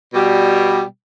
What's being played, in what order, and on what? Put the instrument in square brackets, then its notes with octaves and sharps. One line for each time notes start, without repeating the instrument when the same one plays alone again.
[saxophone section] B2 G3